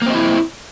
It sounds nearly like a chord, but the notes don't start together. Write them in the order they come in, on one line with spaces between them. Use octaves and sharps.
A#3 C4 D#5 E4